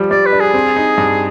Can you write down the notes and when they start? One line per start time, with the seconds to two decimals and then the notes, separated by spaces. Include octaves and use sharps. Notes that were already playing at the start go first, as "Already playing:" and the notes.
Already playing: F3 G3 G4
0.11 G3 D5
0.26 B4
0.32 D4
0.40 G#4
0.54 C4
0.76 D#4
0.98 G2